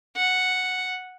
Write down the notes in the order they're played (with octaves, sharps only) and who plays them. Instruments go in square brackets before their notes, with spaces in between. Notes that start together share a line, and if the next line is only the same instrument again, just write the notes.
[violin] F#5